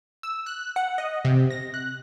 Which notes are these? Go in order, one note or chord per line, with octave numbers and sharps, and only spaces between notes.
E6
F#6
F#5
D#5
C3
A#6
F#6